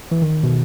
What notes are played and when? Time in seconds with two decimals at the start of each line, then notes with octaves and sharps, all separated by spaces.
0.12 E3
0.22 D#3
0.43 B2